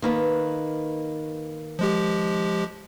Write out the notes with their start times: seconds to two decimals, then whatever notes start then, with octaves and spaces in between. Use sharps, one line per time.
0.02 D#3 A#3 B4
1.79 F3 G#3 G4